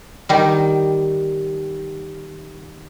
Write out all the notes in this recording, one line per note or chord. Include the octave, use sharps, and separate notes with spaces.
D#3 G3